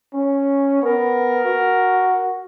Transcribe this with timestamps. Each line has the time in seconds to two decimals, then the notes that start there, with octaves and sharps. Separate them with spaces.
0.14 C#4
0.82 B3 A#4
1.44 F#4